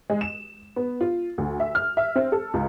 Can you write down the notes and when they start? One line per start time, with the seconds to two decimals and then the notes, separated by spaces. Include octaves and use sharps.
0.10 G#3
0.21 E7
0.76 B3
1.01 F4
1.38 D2
1.60 E5
1.75 F6
1.97 E5
2.16 C4
2.32 A4
2.54 C#2